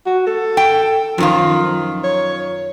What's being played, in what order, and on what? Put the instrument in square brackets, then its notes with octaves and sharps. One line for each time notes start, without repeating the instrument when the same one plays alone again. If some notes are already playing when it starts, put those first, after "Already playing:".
[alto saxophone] F#4
A4
[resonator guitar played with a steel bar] G5
[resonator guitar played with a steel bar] F#2 D#3 F4 [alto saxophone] F3
[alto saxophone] C#5